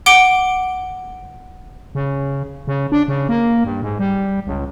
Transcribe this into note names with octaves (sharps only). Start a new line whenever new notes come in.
F#5 D6 D7 G7
C#3
C#3
D4
C#3
A#3
G2
G#2
G3
C#2